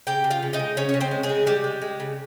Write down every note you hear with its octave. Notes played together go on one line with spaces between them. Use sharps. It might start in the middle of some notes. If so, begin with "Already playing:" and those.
C#3 G4 G5
C#3
F4 F5
C#3
D#4 D#5
G#3
C#3 C#4 C#5
C#5
C#3
C4 C5
G#3
G#3 G#4
C#3
G3 G#3 G4
G#3
G#3
C#3